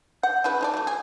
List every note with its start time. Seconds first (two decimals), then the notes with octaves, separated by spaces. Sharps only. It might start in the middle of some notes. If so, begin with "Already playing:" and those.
0.23 F#5 G6
0.44 C#3 E4 B4
0.61 D#4 C5 D5 A5
0.74 F#3 A3
0.87 G#4